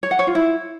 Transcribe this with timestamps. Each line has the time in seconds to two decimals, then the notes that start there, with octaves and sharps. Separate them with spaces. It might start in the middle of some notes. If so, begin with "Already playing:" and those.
0.03 C#5
0.11 F#5
0.19 C#5
0.27 F4
0.35 E4